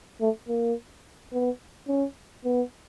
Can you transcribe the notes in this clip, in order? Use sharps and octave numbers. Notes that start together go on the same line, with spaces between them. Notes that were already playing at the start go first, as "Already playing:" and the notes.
A3
A#3
B3
C#4
B3